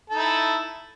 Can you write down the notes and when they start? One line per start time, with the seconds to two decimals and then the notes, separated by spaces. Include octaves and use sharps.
0.10 A4
0.13 D#4
0.17 E4